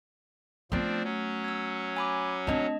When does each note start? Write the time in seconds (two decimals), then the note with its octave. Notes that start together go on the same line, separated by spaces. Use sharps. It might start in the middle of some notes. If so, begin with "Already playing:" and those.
0.72 F3 A3 B3 C4 D4
1.04 F#3 C#4
1.44 E6 G#6
1.97 G#5 B5 D6
2.47 A3 C4 D4 D#5 A5